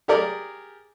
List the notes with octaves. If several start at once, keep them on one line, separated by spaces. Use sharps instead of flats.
G4 G#4 A#4 D5